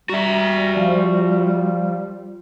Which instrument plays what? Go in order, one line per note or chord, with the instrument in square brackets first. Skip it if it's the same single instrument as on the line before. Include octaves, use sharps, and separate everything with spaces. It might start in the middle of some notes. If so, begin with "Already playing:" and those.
[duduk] G3 [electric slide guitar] F#4 E5 [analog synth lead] A#5
[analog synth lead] F3